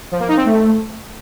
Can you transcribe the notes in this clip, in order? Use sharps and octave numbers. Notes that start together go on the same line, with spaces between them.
F3
A#3
D#4
C4
A3